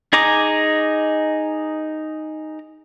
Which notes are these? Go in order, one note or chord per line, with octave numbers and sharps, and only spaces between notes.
D#4 G#4 D#5 A#5 D6